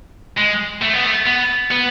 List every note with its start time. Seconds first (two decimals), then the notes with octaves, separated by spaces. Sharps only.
0.37 G#3
0.82 A3
0.93 B3
1.04 A3
1.26 B3
1.71 B3